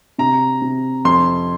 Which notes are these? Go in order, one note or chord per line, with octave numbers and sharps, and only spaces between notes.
C3 A#5
C3
F2 C6